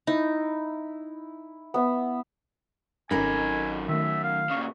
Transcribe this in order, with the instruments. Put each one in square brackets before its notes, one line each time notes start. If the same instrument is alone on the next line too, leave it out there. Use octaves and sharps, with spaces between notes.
[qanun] D#4 [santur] E4
[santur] B3 E5
[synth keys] G#1 C#4 A4 [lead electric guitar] F#2 B5 [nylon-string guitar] D#4 A#4 [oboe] G#5
[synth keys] D#3 A3 [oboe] E5
[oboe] F5
[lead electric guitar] A#2 C#3 [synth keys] C#6 D#6